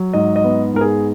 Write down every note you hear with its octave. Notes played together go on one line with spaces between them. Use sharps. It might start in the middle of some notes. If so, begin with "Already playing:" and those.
Already playing: F#3
G#2 D#5
D#5
B3
G#2 A#4
G#4